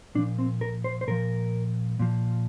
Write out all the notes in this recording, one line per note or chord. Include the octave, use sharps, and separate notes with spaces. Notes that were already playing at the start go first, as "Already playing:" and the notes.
A#2 F3 D4
C4
A#4
C5
C5
A#2 F3 A#4
A#2 F3